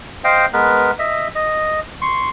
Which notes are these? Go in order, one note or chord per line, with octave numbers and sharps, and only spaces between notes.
C5 D#5 F5 G5
G#3 B3 A#4 B4
D#5 E5
D#5
C6 C#6